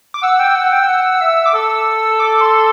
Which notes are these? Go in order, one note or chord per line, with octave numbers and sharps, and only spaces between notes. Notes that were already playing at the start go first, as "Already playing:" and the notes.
D6
F#5 E6
G5
F#5
G5
F#5
E5
D6
A4 E6
D6
C6